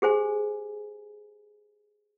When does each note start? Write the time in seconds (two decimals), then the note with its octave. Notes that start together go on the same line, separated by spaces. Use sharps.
0.02 G4 G#4 C5 G#5